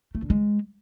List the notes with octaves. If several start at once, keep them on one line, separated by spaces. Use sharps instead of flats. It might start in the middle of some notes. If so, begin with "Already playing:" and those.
A3
D3
G#3